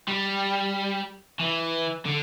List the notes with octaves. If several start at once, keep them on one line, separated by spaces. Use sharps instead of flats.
G3
E3
D3